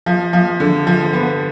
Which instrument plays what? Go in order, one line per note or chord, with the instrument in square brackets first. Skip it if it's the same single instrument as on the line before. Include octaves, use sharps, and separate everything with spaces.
[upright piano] F3
F3
D3
F3
B3